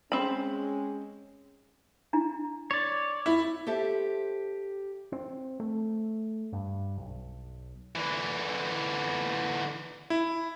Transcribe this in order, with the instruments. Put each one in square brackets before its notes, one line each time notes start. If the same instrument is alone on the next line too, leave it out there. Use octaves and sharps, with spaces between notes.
[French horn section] G#3 C#4 [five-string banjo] C4 B5
[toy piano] D4 E4
[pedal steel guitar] C#5 D5
[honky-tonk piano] E4
[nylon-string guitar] G4 A4 C5 E5
[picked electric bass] C4
A3
G2
B1
[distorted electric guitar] D3 E3
[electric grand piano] E4